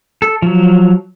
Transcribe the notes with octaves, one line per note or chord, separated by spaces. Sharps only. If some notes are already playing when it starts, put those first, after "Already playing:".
A4
F3 F#3